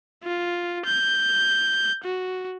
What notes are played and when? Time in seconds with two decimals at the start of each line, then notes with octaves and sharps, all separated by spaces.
0.23 F4
0.86 G6
2.04 F#4